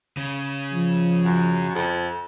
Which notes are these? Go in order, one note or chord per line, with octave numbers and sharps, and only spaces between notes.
C#3
F3
F#2
F2